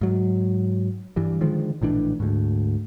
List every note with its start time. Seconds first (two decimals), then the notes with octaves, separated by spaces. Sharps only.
0.01 G#2 F#3
1.16 G2 E3 G3
1.41 D3 D#3 F3 G#3
1.82 A#1 A2 E3 D4
2.20 D2 G#2